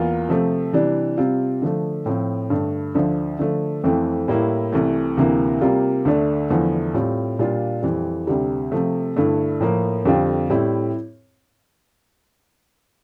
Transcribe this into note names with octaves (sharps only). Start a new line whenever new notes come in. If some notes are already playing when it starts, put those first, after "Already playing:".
Already playing: E2 E3 A#3 F4
C3 F3 A3 C4
C3 E3 G3 D4
C3 G3 C4 F4
D3 F3 A3
A2 F3 C4
G2 D3 A3
D2 D3 F3
D3 F3 A3
F2 E3 A3 C4
A2 G3 A#3 E4
C2 C3 E3 A3
D2 C3 E3 A#3
C3 G3 A#3 F4
D2 D3 A3 D4
E2 D3 F3 A3 E4
A2 G3 C4 F4
A#2 G3 D4 F4
F2 E3 G3
D2 C3 G3
C3 F3 A3
G2 D3 A3 E4
A2 F3 A#3
F2 D3 G3 C4 F4
A2 G3 C4 E4